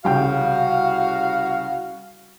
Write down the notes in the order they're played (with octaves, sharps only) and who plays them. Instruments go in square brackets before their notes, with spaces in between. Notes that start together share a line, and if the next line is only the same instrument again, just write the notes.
[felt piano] C2 C#3 G5 [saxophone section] F#4 F5